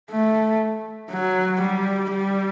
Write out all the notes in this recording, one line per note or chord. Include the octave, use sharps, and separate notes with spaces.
A3
F#3
G3
G3